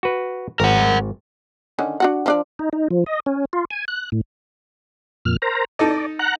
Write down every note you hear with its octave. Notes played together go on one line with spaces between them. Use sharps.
F#4 B4
G#1 A#4 F#5
D3 D#3 C#4
D4 F#4 F#5
F3 D4 D5
D#4
D#4
F3
D#5
C#4
F4
G#5
F#6
A2
F2 A#2 F6
A#4 C5 A#5
D#4 A4 D5 D#5
F#5 A#5 F#6